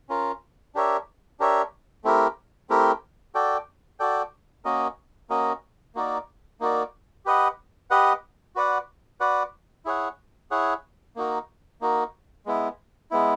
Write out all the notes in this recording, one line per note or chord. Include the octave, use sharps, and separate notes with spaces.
C#4 F4 A#4
D4 G4 A#4 C#5 E5
D4 G4 A#4 C#5 E5
A3 C4 E4 G4 A#4
A3 C4 E4 G4 A#4
F#4 A4 D5 G5
F#4 A4 D5 G5
A#3 C#4 F#4 A#4 D#5
A#3 C#4 F#4 A#4 D#5
A#3 D#4 F#4 A#4 D5
A#3 D#4 F#4 A#4 D5
G4 B4 D#5 F#5
G4 B4 D#5 F#5
F#4 B4 D5 F#5
F#4 B4 D5 F#5
E4 G#4 C#5 F#5
E4 G#4 C#5 F#5
A#3 D#4 F#4 A#4
A#3 D#4 F#4 A#4
G#3 B3 E4
G#3 B3 E4